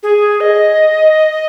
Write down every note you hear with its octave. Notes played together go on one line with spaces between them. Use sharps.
G#4
D#5